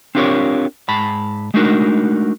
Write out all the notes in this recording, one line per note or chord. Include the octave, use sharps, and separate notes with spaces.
C4 D4 F4 G4 A#4 C#5
G#2 A5 B5
G#3 A3 D4 D#4 F#4 A#4